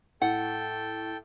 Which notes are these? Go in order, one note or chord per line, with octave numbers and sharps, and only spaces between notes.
A2 A4 F#5 G5